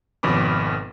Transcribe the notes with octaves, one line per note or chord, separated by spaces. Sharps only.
G#1 F2 B2 C#4 B5 D6